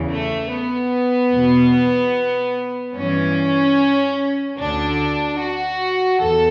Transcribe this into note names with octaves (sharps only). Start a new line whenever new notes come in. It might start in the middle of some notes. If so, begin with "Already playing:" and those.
Already playing: E2 C#3 E3
A3
B3
E2 B2
G2 E3 C#4
D2 D3 D4
F#4
E2 A4